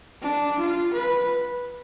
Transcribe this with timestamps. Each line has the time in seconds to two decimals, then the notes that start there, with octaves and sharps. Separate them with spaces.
0.22 D4
0.59 F4
0.94 B4